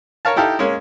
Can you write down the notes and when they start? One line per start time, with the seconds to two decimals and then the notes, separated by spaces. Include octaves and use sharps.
0.25 A#4 C#5 F5 A5
0.36 D#4 E4 G4 A4 F5
0.59 G#3 A#3 C#4